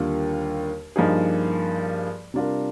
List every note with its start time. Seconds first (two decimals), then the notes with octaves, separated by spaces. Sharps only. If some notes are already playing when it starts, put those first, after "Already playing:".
Already playing: D#2 D3 G3 A#3 F4
0.96 G2 F3 A#3 D#4 G#4
2.34 C3 G3 D4 F4 A#4